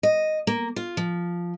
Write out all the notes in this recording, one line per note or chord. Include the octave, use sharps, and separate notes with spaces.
D#5
A#3
F4
F3